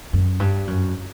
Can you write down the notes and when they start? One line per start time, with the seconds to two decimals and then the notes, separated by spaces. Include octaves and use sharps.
0.13 F#2
0.40 G2
0.67 F#2